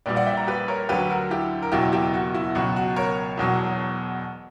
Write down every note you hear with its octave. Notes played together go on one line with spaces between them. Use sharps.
A#1 A#2 G3 B4 D5
D5 F#5
E5 G5
F#5 A#5
G4 B4
A#4 C#5
D2 D3 F#3 G4 B4
F#4 A#4
E4 G4
A#4
F#1 E2 B2 F#3 E4 G4
E4 G4
F#4
E4
C#2 B2 F#3 F#4
F#4
A#4 C#5
E1 E2 B2 F#3